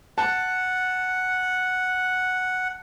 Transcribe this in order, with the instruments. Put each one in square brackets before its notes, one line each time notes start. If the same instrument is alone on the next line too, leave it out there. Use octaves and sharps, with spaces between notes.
[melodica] F#5 [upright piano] A5